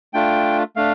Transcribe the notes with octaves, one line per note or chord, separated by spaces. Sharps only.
A3 D4 F4 G5
A3 D4 F5